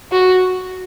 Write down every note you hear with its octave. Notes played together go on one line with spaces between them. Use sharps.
F#4